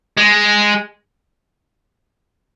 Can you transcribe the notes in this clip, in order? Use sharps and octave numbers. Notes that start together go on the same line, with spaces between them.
G#3